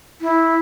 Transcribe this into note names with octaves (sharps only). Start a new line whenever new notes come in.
E4